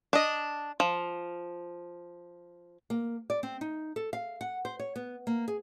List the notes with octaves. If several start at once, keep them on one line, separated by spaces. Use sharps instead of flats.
D4 D#5
F3
A#3
D5
C4
D#4
A4
F5
F#5
C5
C#5
B3
A#3
G#4